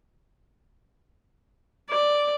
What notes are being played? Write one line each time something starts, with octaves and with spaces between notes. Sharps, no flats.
D5